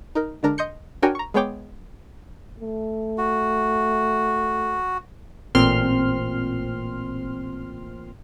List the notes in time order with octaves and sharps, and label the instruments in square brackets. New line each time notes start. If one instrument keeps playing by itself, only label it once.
[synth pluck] D#4 A#4
D3 G#3 D4 A#4
D#5 C6 G6 C#7
D4 F#4 A#4 C#5 G5 G#5
A#5 C#6
G#3 B3 G#4 C#5 G5 D6
[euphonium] A3
[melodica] F#4
[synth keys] A1 A#2 C4 C6 F6